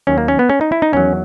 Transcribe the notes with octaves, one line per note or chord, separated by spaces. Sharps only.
D#2 D#3 F#3 C#4
A#3
C#4
B3
C#4
D#4
E4
D#4
E2 D#3 F#3 C#4